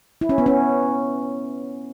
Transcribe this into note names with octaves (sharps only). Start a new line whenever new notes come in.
E4
C#4
B3
C#4